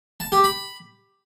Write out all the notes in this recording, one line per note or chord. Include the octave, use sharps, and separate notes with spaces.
A5
G4
B5